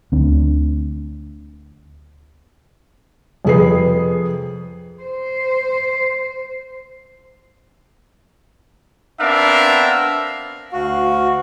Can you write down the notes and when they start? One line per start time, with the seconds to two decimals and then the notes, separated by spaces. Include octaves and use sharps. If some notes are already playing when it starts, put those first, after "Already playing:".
0.12 D2 C4 D4
3.45 F2 C3 G#4 B4 C7
5.03 C5
9.21 B3 C4 D4 A#4 E5 F5
10.73 D2 F#4 F5